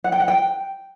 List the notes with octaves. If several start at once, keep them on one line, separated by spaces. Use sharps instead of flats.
F#5
G5
F#5
G5